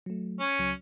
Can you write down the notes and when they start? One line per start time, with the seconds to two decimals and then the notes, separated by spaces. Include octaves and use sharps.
0.06 F#3 A3
0.40 C#4
0.59 C#2 F#3